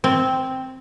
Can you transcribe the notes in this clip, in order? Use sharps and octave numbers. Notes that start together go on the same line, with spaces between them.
C4